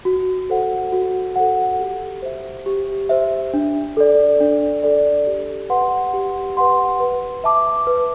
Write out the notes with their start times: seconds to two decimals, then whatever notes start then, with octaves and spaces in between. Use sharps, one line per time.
0.05 F#4
0.50 A4 C5 F#5
0.92 F#4
1.36 A4 C5 F#5
1.79 G4
2.23 C5 E5
2.66 G4
3.09 C5 E5
3.54 D4
3.97 A4 D5
4.40 D4
4.83 A4 D5
5.27 G4
5.70 B4 F#5 C6
6.13 G4
6.57 B4 F#5 C6
7.00 B4
7.44 E5 A5 D6
7.87 B4